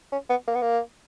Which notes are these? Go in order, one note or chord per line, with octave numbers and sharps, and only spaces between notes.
C#4
B3
A#3
B3
A#3